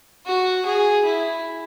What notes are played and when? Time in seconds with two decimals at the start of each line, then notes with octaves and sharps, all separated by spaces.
0.26 F#4
0.66 G#4
1.05 E4